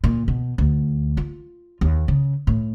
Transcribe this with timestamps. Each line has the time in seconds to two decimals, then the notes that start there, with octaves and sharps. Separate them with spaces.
0.04 A#2
0.28 B2
0.58 D2
1.17 F4
1.81 D#2
2.08 C#3
2.47 A2